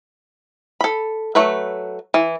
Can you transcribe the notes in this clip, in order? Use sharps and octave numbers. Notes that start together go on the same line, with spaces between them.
A4 B5
F#3 A3 B4
E3